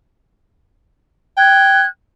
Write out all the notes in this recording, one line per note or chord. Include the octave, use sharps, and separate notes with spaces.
G5 F#6 G#6